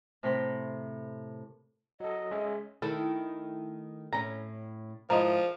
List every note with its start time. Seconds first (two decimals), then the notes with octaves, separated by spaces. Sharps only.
0.23 A2 C3 C4 A#4 B5 C6
2.00 F#3 A4 D#5
2.31 G#3 C#4 E5
2.82 D#3 A3 E4 A4
4.13 A2 C#4 A#5
5.10 G#2 F3 E4 F4 A#4 D#5